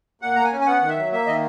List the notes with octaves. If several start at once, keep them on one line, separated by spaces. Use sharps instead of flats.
A#2 F#5
A#3 A#5
G#5
C#4
G#5
B3 F#5
D#3
E5
F#3
A#3 E5
D#3 D#5